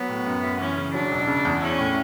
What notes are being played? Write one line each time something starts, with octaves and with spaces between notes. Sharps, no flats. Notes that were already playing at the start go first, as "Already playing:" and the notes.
Already playing: F#3 B3
A2
F#2
F#2
E3 C#4
C#3
F#3 D4
E1
C#3
E2
C#4 E4
A2